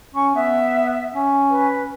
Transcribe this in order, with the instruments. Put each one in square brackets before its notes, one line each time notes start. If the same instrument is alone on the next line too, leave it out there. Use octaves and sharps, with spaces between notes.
[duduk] C#4 [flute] C#6
[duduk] B3 [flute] E5
[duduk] C#4
[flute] B4